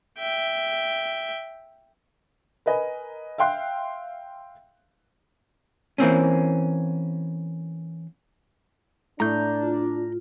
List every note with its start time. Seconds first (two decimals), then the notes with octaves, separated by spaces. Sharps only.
0.19 E5 G5
2.66 A#4 B4 D#5 G#5
3.38 E5 F5 G5 C6 F#6
5.98 E3 A#3 C4 C#4
9.20 A2 D4 A#5 G6
9.62 F4